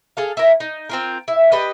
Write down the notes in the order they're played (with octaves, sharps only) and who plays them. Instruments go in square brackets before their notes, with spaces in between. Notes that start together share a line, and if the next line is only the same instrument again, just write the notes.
[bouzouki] G#4 A4 F5
E4 F4 A#4
D#4
C4 F4 A#4
E4
G3 B4 D#5